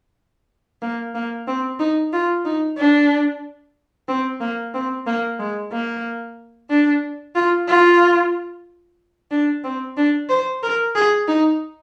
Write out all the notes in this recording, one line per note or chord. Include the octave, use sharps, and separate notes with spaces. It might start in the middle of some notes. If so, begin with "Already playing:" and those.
A#3
A#3
C4
D#4
F4
D#4
D4
C4
A#3
C4
A#3
G#3
A#3
D4
F4
F4
D4
C4
D4
C5
A#4
G#4
D#4